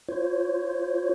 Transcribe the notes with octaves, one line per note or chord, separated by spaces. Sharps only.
F4 C5 C#5